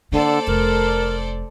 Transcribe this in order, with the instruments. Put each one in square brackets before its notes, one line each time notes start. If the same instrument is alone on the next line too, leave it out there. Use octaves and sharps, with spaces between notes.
[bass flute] D3 [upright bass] A#3 B3 [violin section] A4 C5 D5
[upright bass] F1 [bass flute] A#4